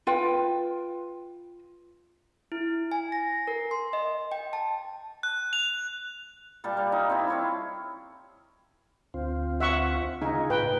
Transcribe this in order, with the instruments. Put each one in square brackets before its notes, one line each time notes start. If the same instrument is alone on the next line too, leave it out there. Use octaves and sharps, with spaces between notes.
[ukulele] F4 B4 G5
[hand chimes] E4
G#5
A#6
A#4
C6
D#5
G5
A5
[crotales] F#6
F7
[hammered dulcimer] A#2 G3 A5
G3
D#4
C4 E4
E4 C#5 F5
[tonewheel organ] D2 C4 F4
[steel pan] E5 F#5 C#6
[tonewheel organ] C#3 F4 G#4 [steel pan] D#4
[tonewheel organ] A2 D#4 [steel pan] B4 G5